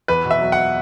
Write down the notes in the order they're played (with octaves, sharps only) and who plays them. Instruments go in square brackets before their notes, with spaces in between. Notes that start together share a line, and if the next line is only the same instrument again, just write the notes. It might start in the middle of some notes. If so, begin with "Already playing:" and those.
[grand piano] E2 B4
B2
E5
F#3
F#5